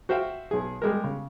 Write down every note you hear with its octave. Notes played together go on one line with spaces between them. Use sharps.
F#4 C5 E5 F5 G5
B1 G#4
G3 G#3 A#4
C#3